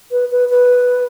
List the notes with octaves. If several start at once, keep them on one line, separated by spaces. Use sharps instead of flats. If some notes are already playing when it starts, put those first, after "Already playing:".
B4
B4
B4